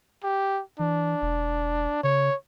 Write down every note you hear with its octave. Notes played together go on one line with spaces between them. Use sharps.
G4
E3 D4
E1
C#3 C#5